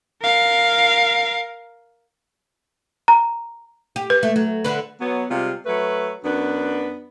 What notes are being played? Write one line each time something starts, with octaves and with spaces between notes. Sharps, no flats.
A#4 F5
A#5
G4
B4
A3
F#3
D3 B4
F#3 B3
C3 G3 G#3 F4
F#3 A3 B4
F#2 B3 D4